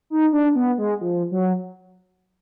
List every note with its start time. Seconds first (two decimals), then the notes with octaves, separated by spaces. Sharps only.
0.10 D#4
0.33 D4
0.56 B3
0.78 G#3
1.01 F3
1.31 F#3